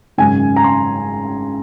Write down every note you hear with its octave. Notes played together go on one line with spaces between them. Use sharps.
G#1 F#2 C#3 G#5
A#5
C6